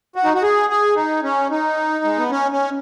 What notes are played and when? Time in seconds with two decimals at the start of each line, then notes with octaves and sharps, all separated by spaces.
0.16 F#4
0.24 D#4
0.34 F#4
0.43 G#4
0.70 G#4
0.96 D#4
1.23 C#4
1.51 D#4
2.04 G#3
2.18 B3
2.31 C#4
2.51 C#4